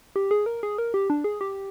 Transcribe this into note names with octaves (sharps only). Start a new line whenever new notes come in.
G4
G#4
A#4
G#4
A#4
G4
D4
G#4
G4